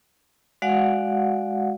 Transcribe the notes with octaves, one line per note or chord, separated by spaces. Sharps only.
G#3 F#4 D5 F5 F#5